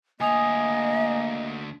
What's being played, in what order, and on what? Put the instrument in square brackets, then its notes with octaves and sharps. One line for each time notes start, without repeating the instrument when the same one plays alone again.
[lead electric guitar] D2 G#4 [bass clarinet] A#3 [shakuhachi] D#5 [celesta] G#5 D#6 F7